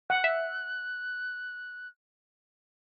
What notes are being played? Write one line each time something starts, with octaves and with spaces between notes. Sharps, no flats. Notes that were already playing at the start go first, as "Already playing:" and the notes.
F#5 F#6
E5